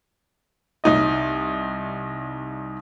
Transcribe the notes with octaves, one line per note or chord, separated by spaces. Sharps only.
C2 D#4 D#5